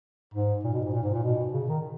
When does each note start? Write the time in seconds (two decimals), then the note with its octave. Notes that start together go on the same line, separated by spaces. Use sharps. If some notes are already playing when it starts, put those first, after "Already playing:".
0.34 G#2
0.64 A#2
0.73 B2
0.84 G#2
0.93 A#2
1.03 G#2
1.13 A#2
1.23 B2
1.53 C#3
1.68 D#3